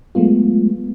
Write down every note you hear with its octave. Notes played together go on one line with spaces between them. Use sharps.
F#3 G#3 A3 B3 F4